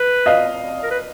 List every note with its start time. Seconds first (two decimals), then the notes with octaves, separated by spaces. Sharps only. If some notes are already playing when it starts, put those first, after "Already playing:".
Already playing: B4
0.26 D#5 F5
0.83 A#4
0.91 B4